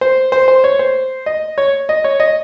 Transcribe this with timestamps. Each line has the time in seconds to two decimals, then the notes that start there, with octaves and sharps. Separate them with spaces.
0.01 C5
0.32 C5
0.48 C5
0.64 C#5
0.79 C5
1.26 D#5
1.58 C#5
1.89 D#5
2.04 C#5
2.20 D#5